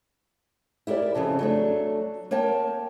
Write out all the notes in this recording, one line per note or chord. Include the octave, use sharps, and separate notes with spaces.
E4 G4 A#4 B4 D5
F2 A#2 C#3 A5
F#3 A3 D4
A#3 A#4 C#5 G5 A5